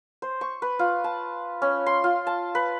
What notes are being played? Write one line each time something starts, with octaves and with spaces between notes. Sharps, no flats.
C5
C#6
B4
F4
A5
C#4
C6
F4
A5
B4